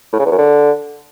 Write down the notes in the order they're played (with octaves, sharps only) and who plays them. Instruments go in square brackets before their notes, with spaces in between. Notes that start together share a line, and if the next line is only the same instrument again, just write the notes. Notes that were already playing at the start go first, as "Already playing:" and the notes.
[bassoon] A2
C#3
E2
F#2
D3